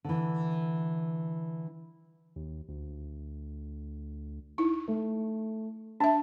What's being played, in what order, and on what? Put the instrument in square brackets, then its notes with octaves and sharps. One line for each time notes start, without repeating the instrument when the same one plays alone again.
[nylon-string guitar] D3 E3
[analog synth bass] D#2
D2
[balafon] D#4 E4
[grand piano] A3
[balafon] D4 E5 [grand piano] A5